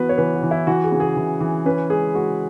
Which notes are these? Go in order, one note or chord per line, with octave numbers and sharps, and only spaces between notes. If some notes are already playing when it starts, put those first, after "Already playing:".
Already playing: E3 B3 F#4 B4
C#5
E3 B4
F#4
E3
E4
E3 F#4
G#4
C#3
G#4
E3
E3
C#4 B4
G#3 G#4
G#3 F#4